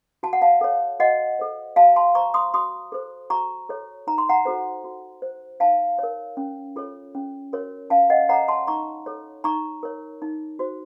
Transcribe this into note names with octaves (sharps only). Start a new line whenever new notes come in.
F#4 A5
F#5
F5 A5
A4 C#5
F#4 D#5 F#5
A4 C5
F#4 F5 A5
A5 C6
C5 A#5 C#6
C6 D#6
F#4 C6 D#6
A4 C5
F#4 A#5 C#6
A4 C#5
D#4 A#5
C6
F#5 A#5
F#4 A4 C5
F#4
C5
D#4 F5 A5
A#4 C#5
C#4
F4 A4 C#5
C#4
F#4 A#4 C#5
C#4 F5 A5
D#5 F#5
A4 C#5 F#5 A#5
A5 C6
D#4 A#5 C#6
A4 C#5
D#4 A#5 C#6
A#4 C#5
D#4
F#4 C5